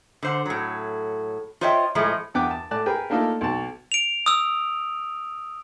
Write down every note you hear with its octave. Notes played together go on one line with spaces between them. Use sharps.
D3 C5 F#5
A2 F#3
F4 C5 C#5 D#5 E5 G5
A2 F3 G#3 A3
E2 G2 B3 G5 D6 F#6
A5
A2 D5 A5 F#6
G#4 A#4 B4 G5
A3 A#3 D4 D#4 F4 A4
B1 A5
D7 F7
D#6 E6